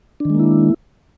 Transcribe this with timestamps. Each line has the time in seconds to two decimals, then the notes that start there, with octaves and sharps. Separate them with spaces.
0.20 D4
0.25 D#3
0.30 G#3
0.35 A#3
0.39 E4